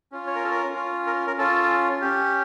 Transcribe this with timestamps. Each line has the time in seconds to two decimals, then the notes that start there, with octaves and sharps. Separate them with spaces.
0.12 C#4 F4
0.27 C#5
0.35 A#4
0.44 A4
0.51 A#4
0.75 C#4 F4
1.07 A#4
1.27 A#4
1.38 C#4 F4 A4
2.01 C#4 G4